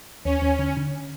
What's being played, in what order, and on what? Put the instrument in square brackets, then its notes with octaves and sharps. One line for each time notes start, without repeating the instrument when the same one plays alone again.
[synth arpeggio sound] D#2 [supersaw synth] C#4
[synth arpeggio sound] D#2
D3
D3